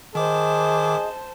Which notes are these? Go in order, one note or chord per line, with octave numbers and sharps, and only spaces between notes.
D#3 G#4 C5 D#5 A5 D6